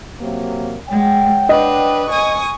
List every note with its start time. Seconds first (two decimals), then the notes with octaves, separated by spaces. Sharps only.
0.21 C3 F#3 A#3
0.90 G#3 C#5 F#5 G5
1.49 D4 B4 D#5
2.11 G#5 C#6 D#6